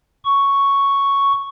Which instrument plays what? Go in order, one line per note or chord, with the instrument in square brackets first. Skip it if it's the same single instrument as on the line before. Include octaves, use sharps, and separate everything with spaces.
[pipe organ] C#6